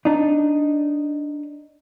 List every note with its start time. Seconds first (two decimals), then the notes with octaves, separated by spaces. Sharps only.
0.05 D4 D#4